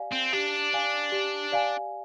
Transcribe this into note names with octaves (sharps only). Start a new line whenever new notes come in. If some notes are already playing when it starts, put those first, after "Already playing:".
Already playing: G4 D5 F5 G#5
C4
D4 G4
D5 F5 G#5
G4
D5 F5 G#5